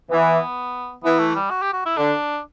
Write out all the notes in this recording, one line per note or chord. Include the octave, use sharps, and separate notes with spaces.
E3 B3
E3 B3
A3
G3
F#4
G4
F#4
E4
D3 D4